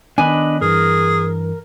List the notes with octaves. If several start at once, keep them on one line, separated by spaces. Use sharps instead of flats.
D#3 B3 D4 D#5 G#5 B5 F#6
G2 E3 G#4 A#4